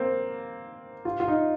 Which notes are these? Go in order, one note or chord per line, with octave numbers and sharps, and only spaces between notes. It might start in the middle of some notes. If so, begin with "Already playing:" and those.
Already playing: A#3 C4
F4
F4
D#4